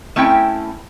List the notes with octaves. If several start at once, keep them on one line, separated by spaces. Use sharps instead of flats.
A3 C4 C#4 E4 G5